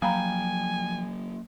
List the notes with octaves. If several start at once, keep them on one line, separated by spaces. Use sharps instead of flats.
F3 F#3 A#3 F5 G5 G#5 A#5 B5